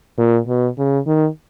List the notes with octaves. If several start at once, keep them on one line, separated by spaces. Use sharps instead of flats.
A#2
B2
C#3
D#3